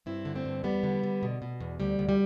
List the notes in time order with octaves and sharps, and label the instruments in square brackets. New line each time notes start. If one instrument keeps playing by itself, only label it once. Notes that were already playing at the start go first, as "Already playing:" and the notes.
[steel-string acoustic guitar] G2 C4 E4
D3
A3 C4
G2
E2 G3 B3
D3
D3
B2
B2
E2
D2 G3
D2
G3